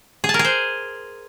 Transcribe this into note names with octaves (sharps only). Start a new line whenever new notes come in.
G#4
A5
A#4
G#4
C5